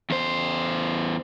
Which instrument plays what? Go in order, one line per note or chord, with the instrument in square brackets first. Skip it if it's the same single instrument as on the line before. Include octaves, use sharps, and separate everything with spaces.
[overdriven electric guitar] E2 C5